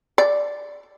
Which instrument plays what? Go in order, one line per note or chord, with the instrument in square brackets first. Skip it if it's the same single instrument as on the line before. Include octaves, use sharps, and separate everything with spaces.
[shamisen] D5